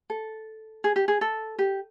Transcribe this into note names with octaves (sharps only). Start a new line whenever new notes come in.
A4
G#4
G4
G#4
A4
G4